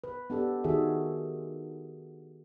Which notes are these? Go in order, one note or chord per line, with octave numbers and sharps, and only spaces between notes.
B4
B3 D4 G4 A4
D#3 F#4 G#4 A4 E5